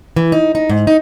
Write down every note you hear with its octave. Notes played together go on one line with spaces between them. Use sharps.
E3
D#4
D#4
G#2
D#4